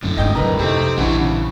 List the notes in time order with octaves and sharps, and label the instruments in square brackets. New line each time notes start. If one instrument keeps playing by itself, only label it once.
[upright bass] F#2 C4 [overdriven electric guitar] A2 D3
[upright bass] G1 G#2 [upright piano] D#5 G5 G6
[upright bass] C#2 F#2 [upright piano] A#4 B4 A#5
[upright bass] F2 [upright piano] C3 A3 D#4 [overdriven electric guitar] C4
[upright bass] A#1 [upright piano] G2 E3 [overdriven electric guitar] C4 F#4
[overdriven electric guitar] C#3